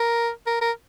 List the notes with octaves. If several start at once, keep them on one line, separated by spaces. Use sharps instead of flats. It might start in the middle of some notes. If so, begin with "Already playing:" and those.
Already playing: A#4
A#4
A#4